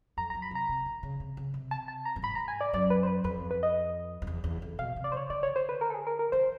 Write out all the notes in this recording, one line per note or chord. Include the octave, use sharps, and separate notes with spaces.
F2 A#5
A#5
F#2
B5
C3 A#5
C3
D3
C#3
C3
C#3
C3
A5
A5
A#5
G2
G#2 B5
A#5
G#5
D5
F#2 D5
B4
C5
B4
F2 B4
B4
D#5
F2
E2
E2
F2
B2 F5
C3
D5
C#3 C5 C#5
D3 D5
C#5
C5
B4
A#4
A4
G#4
A#4
A#4
D#3 C5